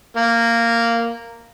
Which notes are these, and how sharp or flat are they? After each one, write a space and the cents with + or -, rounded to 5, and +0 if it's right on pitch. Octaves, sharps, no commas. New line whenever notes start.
A#3 -10